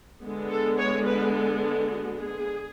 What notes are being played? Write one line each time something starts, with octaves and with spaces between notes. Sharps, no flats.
D3 G#3 B3
A4
C#5
B4
A4
A4
F#4
G#4